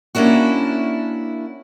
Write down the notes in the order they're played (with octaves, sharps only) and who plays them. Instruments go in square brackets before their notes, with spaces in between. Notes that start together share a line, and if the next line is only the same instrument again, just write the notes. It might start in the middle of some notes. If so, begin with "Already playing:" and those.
[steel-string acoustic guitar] A#3 C#4 D4 E4 F#4